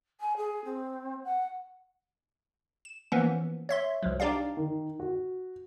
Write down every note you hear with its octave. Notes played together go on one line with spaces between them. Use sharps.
G#5
G#4
C4
F#5
E7
E3 F3 A#3 B3 C#4
C#5 E5 C6
C2 F3 F#3
D4 D#4 G4 D5 F5
D#3
F#4